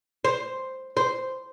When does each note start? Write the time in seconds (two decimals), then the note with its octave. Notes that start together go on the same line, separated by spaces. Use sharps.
0.25 C5
0.97 C5